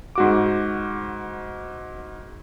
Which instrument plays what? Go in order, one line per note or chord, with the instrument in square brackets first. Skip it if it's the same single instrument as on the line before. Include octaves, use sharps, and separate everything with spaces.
[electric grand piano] G#2 F#4 D6